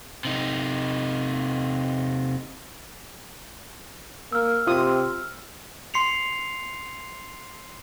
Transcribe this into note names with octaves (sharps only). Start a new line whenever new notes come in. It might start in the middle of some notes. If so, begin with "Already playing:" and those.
C3 D#4
A#3 E6 F6
C3 F4 D#6
C6 C7 C#7 F7